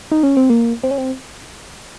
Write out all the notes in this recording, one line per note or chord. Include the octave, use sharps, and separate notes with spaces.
D#4
C#4
C4
A#3
C4
C#4
C4